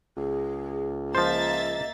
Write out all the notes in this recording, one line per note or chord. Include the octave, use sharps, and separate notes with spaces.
C#2 G#4
F3 A#3 C5 D#5 E5 A6